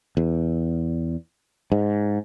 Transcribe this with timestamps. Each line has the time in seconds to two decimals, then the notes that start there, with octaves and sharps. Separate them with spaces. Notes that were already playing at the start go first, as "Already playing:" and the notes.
0.17 E2
1.72 G#2